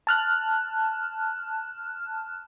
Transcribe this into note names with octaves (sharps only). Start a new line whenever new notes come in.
A5 F6 F#6